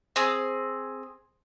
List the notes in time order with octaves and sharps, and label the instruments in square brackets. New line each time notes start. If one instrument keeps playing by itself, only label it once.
[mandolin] C4 G#4